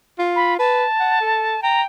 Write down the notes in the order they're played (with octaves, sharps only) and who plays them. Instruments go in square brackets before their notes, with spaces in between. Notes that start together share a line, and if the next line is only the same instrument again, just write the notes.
[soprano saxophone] F4
[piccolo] B5
[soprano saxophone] B4 [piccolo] A5
[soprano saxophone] F#5
A4
[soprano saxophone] G5 [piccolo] A#5